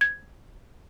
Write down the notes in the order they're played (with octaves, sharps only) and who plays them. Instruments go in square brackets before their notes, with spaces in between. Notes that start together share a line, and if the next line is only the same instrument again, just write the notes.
[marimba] G#6